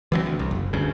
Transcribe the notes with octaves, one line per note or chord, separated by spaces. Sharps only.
E3 F#3 G#3 C4
D2
C2
F#1
G1 D2 G2 C#3